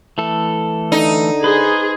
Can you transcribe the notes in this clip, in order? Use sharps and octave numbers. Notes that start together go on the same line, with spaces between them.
E3 A3 A4
D3 D#4
G#4 B4 C5